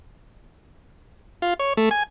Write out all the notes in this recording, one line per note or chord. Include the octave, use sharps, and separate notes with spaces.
F4
C#5
A3
G#5